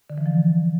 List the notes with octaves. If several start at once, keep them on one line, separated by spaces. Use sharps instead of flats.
D3
E3
F3